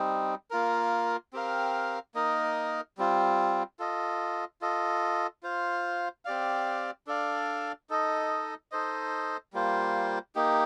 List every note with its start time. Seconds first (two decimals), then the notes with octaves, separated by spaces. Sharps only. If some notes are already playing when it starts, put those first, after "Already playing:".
Already playing: G3 C4 D#4
0.51 A#3 F4 A#4
1.33 C4 G4 A#4 F5
2.15 A#3 D#4 A#4 D#5
2.98 G3 C4 F4
3.79 F4 A4 D#5
4.61 F4 A4 D#5
5.43 F4 C5 F5
6.25 C4 G4 D5 F5
7.07 D4 A4 D5 F5
7.90 D#4 A4 D#5
8.72 D#4 A4 C5 D#5
9.53 G3 A#3 F4 C5
10.35 A#3 D#4 G4